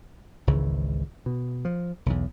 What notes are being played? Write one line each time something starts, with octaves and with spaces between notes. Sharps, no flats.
G#1 C#2 C#3 E3
B2
F3
B1 E2